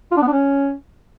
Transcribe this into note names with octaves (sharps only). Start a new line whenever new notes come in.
F4
D4
B3
D4
C#4